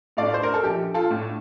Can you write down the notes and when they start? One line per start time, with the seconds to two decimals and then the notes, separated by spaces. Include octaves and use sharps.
0.17 A2 A3 D4 D5 F5
0.34 C5
0.43 A#4
0.54 A4
0.63 A#1 G4
0.94 F4 A4
1.10 A2 A3 D4